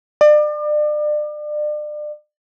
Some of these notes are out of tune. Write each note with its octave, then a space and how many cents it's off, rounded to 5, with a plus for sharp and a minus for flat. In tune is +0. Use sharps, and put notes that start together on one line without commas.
D5 +35